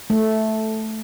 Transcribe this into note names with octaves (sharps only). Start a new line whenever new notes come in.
A3